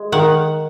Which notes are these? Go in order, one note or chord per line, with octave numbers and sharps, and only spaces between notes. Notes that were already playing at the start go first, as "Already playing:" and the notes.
Already playing: G#3
D#3 F#5